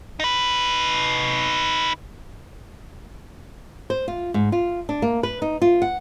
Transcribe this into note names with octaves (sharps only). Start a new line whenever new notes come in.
D#4 B4
C5
F4
G#2
F4
D4
A#3
B4
D#4
F4
F#5